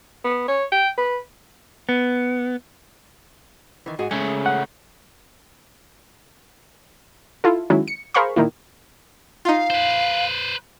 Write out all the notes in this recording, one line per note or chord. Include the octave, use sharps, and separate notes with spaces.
B3
C#5
G5
B4
B3
D#3 E3
G#2 F#4 G#4
C#3 G#3 A3 C#4
F#5
E4 F4 A4
D#3 F#3 G#3 C#4 E4
C#7
G#4 A#4 C5 F5 B5 C#6
A#2 D#3 A#3 E4
D#4 F4 F5
B4 C5